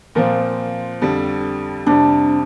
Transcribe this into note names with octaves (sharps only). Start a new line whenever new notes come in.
A#2 F3 C4 A#4
F2 D3 G3
F2 C3 G3 D4